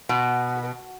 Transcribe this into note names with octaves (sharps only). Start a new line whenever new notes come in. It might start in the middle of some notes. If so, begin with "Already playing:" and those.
B2